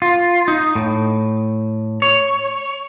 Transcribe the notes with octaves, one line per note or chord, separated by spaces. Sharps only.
F4
D#4
A2
C#5